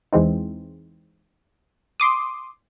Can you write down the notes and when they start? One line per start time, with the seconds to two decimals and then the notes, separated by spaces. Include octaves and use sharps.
0.13 E2 E3 G#3 C4 D#4
2.00 C6 D6 D#6